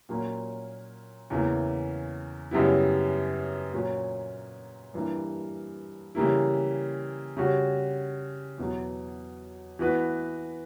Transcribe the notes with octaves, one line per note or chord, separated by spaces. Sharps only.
A#2 F#3 A#3 C#4
E2 C#3 E3 A#3
F#2 C#3 G3 B3 E4
A#2 F#3 C#4
G2 E3 A#3
C#3 E3 G3 A#3 E4
C#3 G3 C#4 F#4
E2 B2 F#3
E3 B3 F#4 B4